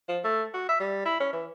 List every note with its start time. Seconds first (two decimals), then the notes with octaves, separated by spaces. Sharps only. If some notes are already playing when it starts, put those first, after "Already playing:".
0.08 F3
0.24 A3
0.54 F#4
0.68 E5
0.80 G3
1.05 E4
1.20 C#4
1.33 E3